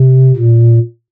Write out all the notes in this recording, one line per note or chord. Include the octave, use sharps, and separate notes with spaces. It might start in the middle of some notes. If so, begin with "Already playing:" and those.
Already playing: C3
A#2